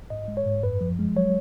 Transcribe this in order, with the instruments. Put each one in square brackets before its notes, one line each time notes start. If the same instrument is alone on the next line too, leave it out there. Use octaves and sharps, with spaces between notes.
[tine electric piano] G#2 D#5
G#3
C#5
G#2
F#2 B4
F3
G#3
F#3 C#5